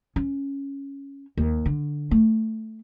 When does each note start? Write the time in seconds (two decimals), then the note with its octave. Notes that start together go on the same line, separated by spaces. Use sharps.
0.16 C#4
1.37 D#2
1.66 D3
2.11 A3